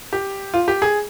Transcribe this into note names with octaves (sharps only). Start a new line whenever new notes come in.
G4
F4
G4
G#4